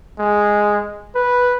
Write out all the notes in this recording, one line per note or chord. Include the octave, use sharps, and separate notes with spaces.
G#3
B4